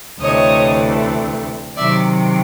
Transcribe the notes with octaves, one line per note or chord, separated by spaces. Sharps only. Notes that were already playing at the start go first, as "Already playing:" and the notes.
D2 C3 E3 A3 C#5 D#5
C3 D#3 F#3 D5 E5